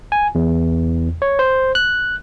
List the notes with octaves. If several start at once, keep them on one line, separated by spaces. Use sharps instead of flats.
G#5
E2
C#5
C5
F#6